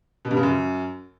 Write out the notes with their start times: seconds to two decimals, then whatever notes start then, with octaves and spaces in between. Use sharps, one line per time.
0.25 B2
0.31 G2
0.37 C#3
0.43 F#2